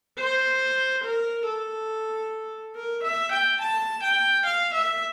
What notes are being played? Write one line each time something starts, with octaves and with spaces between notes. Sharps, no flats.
C5
A#4
A4
A#4
E5
G5
A5
G5
F5
E5